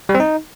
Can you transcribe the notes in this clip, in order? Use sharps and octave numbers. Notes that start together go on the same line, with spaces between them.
G3
C4
D#4